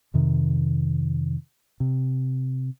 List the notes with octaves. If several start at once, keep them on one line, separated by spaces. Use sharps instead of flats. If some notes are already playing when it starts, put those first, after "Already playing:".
F2 C3 D#3
C3